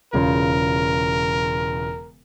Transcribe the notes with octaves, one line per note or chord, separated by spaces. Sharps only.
E1 C#3 F4 A#4